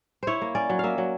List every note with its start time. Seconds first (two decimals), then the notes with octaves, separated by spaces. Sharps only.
0.23 E4 C5 C#5
0.41 A#3
0.55 C#4 D5
0.69 F#3
0.79 A#3 E5 F5
0.98 F#3